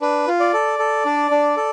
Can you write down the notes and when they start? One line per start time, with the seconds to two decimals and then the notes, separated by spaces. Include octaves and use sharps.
0.01 D4 B4
0.28 F4
0.40 D5
0.53 A4
0.79 A4
1.05 D4
1.31 D4
1.57 A4